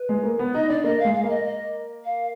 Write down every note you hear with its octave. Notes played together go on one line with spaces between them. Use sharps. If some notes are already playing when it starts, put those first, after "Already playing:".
Already playing: B4
G#3
A#3
B3
D#4 D#5
D4 D5
A#3 D#5
F5
G#3
F5
A#3 F5
D#5
D#5
F5